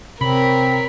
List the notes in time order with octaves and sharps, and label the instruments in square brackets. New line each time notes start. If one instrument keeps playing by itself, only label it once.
[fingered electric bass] C3 [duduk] C4 [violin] A#4 C#5 [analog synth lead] B5